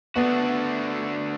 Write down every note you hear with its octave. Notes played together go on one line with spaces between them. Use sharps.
D3 A3 B3 D4 F#4